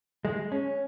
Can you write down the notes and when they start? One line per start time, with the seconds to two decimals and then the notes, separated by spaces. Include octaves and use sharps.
0.25 G#3
0.52 C#4